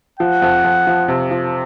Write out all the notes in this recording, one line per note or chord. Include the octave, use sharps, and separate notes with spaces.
F3 F#5
F2
F2
F3
C3
F3